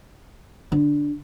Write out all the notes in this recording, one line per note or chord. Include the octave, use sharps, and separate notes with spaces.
D3